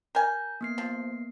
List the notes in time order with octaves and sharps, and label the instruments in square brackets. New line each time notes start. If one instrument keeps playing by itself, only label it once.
[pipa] A#4 G#5 [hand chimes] A#5 G6
[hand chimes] A#3 B3 C7
[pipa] F3